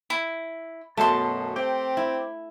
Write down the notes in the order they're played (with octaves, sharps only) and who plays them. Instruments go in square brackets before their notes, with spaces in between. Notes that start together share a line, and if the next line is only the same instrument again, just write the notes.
[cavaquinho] E4
[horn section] F#2 B2 [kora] A3 A4 [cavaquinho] A5 C6
[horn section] C4 G4 [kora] G5
[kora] E4